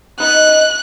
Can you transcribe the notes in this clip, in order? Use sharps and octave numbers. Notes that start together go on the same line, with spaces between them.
B3 D#4 F#6